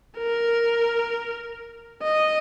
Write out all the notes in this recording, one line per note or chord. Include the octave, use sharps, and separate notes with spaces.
A#4
D#5